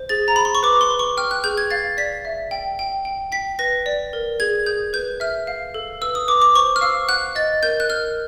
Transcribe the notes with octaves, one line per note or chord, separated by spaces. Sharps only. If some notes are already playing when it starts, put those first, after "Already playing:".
Already playing: C5
G#4 A6
A#5
G#4 B5
C6
C#6
B4 D6
C6
B4
C#6
G5 F6
F#6
G#4 G6
G#6
F5 A6
D5 B6
E5
G5
G5
G5
G5 B6
B4 A#6
D5
A#4
G#4 G#6
G#4 G6
B4 G6
E5 F6
F5
A4
B4 E6
D#6
B4 D6
D6
C5 C#6
F6
F5 E6
F#5 F#6
D#5 A6
A#4 G6
F#6
A#4 F6